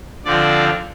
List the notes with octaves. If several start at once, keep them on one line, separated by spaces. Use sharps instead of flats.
D3 F3 C4 F4 D5